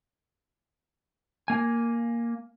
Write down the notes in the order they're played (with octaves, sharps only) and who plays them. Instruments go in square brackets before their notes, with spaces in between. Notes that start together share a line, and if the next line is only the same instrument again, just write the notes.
[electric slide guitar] A#3 G#5